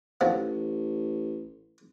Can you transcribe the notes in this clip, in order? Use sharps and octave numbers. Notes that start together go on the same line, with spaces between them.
A1 D#2 F3 F#3